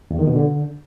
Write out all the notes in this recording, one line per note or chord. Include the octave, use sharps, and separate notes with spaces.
E2
D#3
B2
D3